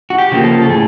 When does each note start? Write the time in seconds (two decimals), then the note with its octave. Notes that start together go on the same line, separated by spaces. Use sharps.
0.10 F#4
0.18 G4
0.32 C#3 F3 A#3
0.44 A4
0.62 A4
0.69 A2 G#4